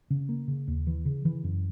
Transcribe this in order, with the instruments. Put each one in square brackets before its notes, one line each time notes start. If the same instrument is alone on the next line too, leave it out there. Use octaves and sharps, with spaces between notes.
[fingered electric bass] C#3
A#3
C#3
D#2
E3
C#3
E3
F#2